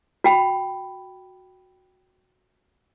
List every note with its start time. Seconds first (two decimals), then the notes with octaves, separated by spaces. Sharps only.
0.24 F#4 G5 B5